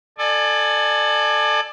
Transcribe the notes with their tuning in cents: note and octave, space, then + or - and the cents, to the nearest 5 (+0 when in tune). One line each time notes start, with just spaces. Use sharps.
A4 +0 D5 +30 G#5 +0